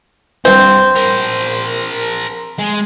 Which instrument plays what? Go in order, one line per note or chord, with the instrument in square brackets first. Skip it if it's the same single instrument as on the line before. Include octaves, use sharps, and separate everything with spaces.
[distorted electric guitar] B1 G2 [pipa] C4
[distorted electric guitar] A#4 C5
G#3